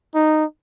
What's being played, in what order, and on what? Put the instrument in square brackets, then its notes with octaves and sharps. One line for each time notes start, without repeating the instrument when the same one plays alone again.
[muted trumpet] D#4